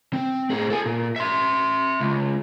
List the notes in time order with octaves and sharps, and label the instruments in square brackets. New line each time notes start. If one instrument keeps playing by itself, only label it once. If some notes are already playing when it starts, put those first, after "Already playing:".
[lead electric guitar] C4
A2 G#4
A4 G#5
A#2
E5 C6
C#2